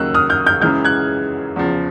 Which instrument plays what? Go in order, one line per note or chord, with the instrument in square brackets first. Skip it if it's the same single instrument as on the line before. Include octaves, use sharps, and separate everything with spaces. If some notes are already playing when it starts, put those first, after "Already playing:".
Already playing: [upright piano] D#2 C#3 F#3 A#3 D#4 [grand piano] E6 F#6
[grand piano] D#6 F6
F6 G6
F6 G6
[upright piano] F#2 C#3 E3 G#3 [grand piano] F6 G6
[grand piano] F#6 G#6
[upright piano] E2 C#3 F3